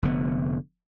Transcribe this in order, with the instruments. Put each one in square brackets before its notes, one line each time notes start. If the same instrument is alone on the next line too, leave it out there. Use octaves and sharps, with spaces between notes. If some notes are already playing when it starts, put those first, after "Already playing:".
[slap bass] F1 D3 B3